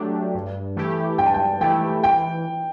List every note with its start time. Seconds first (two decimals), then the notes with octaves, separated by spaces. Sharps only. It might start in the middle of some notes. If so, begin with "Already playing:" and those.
Already playing: F#3 A3 D4 G4
0.35 G2
0.76 E3 A3 E4 G4
1.18 G2 G5
1.26 A5
1.34 G5
1.61 E3 A3 E4 G4 G5
2.03 E3 G5